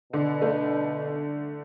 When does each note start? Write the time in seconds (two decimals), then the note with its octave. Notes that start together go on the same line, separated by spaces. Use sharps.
0.13 B2 D3
0.41 A3